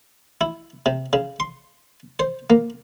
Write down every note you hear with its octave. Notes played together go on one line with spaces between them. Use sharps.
E4
C3
C#3
C6
C5
A#3